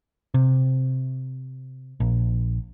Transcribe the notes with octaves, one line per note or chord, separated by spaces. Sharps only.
C3
A#1